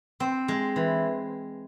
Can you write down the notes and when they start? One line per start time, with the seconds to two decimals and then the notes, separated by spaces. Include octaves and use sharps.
0.20 C4
0.48 G#3
0.76 E3